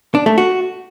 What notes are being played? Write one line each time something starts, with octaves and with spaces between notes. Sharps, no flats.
D4
A3
F#4